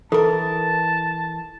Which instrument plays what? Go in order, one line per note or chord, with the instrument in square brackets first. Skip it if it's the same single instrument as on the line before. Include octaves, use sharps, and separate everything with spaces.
[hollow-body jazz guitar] E3 A#4 [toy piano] A4 [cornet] A5